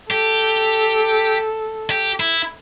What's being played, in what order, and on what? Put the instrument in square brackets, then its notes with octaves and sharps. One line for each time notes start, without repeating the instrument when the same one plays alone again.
[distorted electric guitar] G4 [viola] A4
[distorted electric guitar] G4
E4